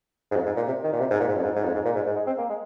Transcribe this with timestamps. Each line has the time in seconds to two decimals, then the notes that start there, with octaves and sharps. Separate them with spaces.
0.31 G#2
0.35 F2
0.46 G#2
0.56 A#2
0.67 C3
0.83 D#3
0.93 A#2
1.00 C3
1.10 G#2
1.20 A#2
1.28 G#2
1.36 F2
1.44 G#2
1.56 G#2
1.64 F2
1.74 G#2
1.85 A#2
1.95 G#2
2.06 G#2
2.16 G#3
2.27 C4
2.38 A#3
2.49 G#3